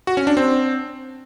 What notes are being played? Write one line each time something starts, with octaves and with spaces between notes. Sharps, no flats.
F#4
C#4
D4
C4